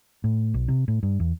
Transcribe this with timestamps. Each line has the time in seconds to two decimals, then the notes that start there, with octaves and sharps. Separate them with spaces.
0.24 A2
0.54 B1
0.68 C3
0.88 A2
1.03 G2
1.20 E2